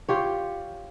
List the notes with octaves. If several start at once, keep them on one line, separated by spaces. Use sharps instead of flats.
F4 G4 C#5